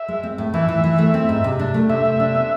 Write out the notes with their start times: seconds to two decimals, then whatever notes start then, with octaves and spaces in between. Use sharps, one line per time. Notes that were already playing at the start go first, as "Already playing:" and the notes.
Already playing: E5
0.08 G#3
0.23 C4
0.38 A2
0.54 E3 E5
0.68 E3
0.84 E3
0.98 A3
1.14 C4
1.29 G#2
1.44 C3
1.59 D4
1.74 A3
1.89 C3 E5
2.05 C3
2.20 D4
2.35 B3